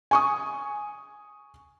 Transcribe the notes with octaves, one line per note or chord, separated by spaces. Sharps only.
G#5 C#6 D#6